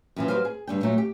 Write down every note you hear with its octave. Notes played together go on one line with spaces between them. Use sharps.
F#2 E3 F3
F#3 G4 B4 C5 F5
G#4
G2 D3 G5
A#2 F#3 A3
G4